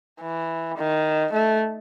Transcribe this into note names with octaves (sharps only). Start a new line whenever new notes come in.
E3
D#3
A3